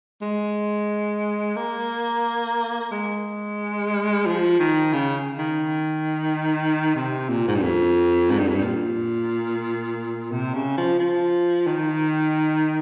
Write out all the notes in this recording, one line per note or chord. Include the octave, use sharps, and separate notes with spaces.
G#3
A#3
A#3
G#3
F3
D#3
C#3
D#3
C3
A#2
G#2
G2
F2
G#2
G2
F2
G2
A#2
C3
C#3
F3
F3
D#3